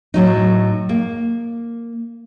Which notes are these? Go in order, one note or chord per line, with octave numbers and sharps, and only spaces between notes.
A2 F#3 D#4
A#3